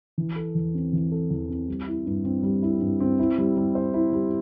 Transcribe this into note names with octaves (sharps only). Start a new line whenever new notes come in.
E3
A4
E2
C4
E3
A4
E2
C4
G3
E4
G2
C4
G3
E4
G2
C4
E4
G3
G3
C5
E4
G3